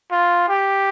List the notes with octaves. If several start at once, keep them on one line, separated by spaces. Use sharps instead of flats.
F4
G4